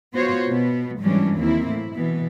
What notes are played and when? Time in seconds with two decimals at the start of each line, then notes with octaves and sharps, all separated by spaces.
0.13 B3 F4 F#4 C5 C#5
0.46 B2 B3
1.00 G#2 E3 F#3 G3 C#4 D4
1.35 D#2 A#3 C4 E4
1.65 A2 E4
1.95 B2 E3 B3